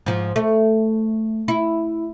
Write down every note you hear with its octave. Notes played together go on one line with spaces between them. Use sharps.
G#2 F3
A3
E4